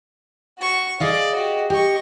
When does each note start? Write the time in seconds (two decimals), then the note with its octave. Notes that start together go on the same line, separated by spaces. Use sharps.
0.59 F#4 C#6
1.00 G#4 D5 D#5 F5
1.35 F#4 G4
1.70 G4 D#5 C#6